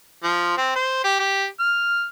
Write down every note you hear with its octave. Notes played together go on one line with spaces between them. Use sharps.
F3
C4
C5
G4
G4
F6